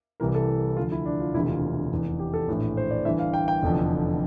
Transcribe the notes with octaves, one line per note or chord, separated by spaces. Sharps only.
C2 C3 E3 A#4
A4
D2 D3 F3 F4
E4
D4
F4
E1 D2 C3 E3 E4
F4
F1 E2 E3
G4
A4
A#1 A2 E3
C5
D5
G1 G2 E3 E5
F5
G5
G5
F1 E2 D3 F3